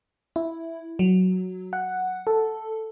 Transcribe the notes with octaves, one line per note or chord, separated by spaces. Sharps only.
E4
F#3
F#5
A4